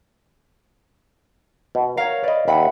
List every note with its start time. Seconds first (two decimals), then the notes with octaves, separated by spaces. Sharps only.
1.75 B2
1.97 A#4 C#5 F5
2.23 B4 D5 D#5
2.48 D#2 E5 F#5 B5